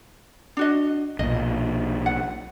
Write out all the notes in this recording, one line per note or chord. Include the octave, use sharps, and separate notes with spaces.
D4 F#4 D#5
B1 A#2 D#5
F#5